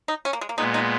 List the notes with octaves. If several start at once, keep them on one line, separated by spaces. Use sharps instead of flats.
D#4
C#4
A#3
G#3
A#3
A#2 G#3 B3 D#4
D#4